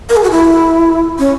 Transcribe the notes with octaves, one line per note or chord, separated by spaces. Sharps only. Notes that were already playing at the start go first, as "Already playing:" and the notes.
A#4
G#4
F#4
E4
C#4